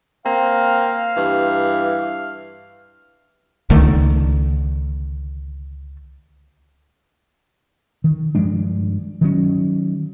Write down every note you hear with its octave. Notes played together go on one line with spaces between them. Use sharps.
A#3 C4 F5
G2 E3
C#2 D3 D#3 A3
D#3
G2 F3 G#3 D4
D#3 F#3 C#4